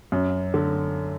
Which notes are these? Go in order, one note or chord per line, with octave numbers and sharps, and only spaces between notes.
F#2
D3